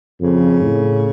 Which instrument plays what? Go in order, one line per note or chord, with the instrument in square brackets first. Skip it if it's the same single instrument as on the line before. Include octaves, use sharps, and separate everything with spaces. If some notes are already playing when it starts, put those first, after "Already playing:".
[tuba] F2 [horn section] C#3
[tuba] A2